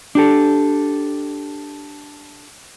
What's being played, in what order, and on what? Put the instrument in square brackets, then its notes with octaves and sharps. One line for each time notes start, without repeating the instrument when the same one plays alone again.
[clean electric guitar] D4 G4 A4